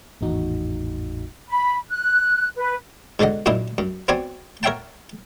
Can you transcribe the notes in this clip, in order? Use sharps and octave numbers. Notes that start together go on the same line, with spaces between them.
G#1 E2 A2 D#4 F#4
B5
F#6
B4
G#2 B2 D3 D#5 F#5
F#2 A#2 D#4 E4 D#6
F#2
B3 C4 F#4 C#5 D5 G#5
A#4 C#5 E5 F#5 G5 A5